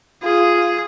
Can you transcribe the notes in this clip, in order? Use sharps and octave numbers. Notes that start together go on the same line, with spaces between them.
F4 G#4